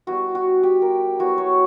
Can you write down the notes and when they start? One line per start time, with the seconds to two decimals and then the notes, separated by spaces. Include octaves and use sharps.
0.07 G3 B3 E4 F#4
0.35 F#4
0.63 G4
0.82 A#4
1.19 F#3 B3 E4 F#4
1.38 C#5